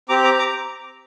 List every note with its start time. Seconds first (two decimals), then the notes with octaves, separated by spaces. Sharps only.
0.09 C4 G4 A#5 D6
0.24 A#5 D6
0.39 A#5 D6